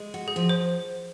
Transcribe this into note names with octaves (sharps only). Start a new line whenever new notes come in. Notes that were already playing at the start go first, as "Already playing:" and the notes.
Already playing: G#3
F#4
G#4
F3
C5